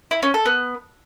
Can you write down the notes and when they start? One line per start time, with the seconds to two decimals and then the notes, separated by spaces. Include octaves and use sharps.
0.11 E4
0.23 C#4
0.34 A4
0.46 B3